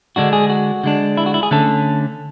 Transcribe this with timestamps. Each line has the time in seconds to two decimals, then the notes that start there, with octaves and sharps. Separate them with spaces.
0.16 D3 G#3 D4 F#4
0.33 G#4
0.50 F#4
0.84 D3 G#3 D4
1.17 E4
1.26 F#4
1.34 E4
1.43 G#4
1.51 D3 A3 C#4 A4